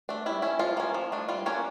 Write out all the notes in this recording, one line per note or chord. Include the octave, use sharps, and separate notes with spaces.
A3 D4
G3 E4
C#4 E4
F3 F4
A#3 C#4
F3
A3 D4
G3 F4
A#3 C#4 D4 C#5